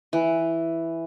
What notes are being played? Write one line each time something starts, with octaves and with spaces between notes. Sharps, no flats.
E3